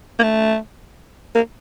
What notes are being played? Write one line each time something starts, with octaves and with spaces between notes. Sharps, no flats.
A#3
A3
A#3